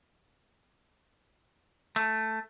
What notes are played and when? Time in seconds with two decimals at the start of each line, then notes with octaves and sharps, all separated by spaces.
1.96 A3